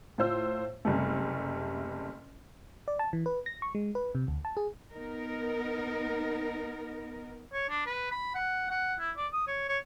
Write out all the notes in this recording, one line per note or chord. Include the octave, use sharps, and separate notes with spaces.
A2 F4 C5 E6
F#1 C3 G3 A3
D5
A5
E3
B4
A#6
C#6
G#3
B4
C3
D2
A5
G#4
B3 D#4 A#4
C#5
D4
B4
B5
F#5
F#5
E4
D5
D#6
C#5
C#5